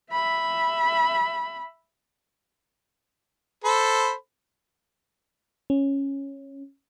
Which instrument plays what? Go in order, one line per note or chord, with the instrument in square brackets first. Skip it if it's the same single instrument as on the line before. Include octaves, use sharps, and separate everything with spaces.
[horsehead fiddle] E5 B5
[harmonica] A4 C5 B5
[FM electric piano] C#4